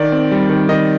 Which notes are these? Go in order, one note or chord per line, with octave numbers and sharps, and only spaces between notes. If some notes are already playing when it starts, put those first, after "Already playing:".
Already playing: D#3 D5
C4
G3
D#3
D#3 D#5